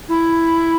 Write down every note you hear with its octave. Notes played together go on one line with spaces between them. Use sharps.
E4